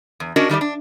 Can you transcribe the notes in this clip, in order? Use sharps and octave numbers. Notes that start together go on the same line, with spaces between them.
E2
C#4 D4 F#4 A#4 D#5
D#3 G3 A3 D5
D4